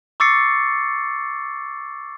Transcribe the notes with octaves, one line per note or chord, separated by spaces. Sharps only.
C#6 D6 E6 A6 C7 C#7